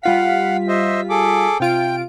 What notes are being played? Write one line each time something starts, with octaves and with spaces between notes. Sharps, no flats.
G3 F4 F5 F#5 B6
C5 D#5 E5
G#4 A4 D6
C3 F4 G5 D7